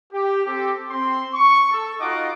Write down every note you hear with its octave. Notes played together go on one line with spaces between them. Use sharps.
G4
C4 G4 A4
C4 C6
C#6
A4
D#4 F4 F#4 D#5 F#5 D6